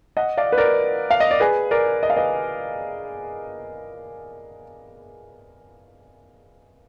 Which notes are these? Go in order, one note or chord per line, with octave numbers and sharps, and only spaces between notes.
D#5 F#5
D5 F5
B4
A#4 D5
F5
D#5
D5
G#4 B4
A#4 D5
D#5
F5
B4 D#5